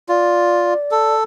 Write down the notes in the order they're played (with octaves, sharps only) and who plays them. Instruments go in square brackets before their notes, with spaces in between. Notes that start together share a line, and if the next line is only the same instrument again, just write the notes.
[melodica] F4 [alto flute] D5
[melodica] A4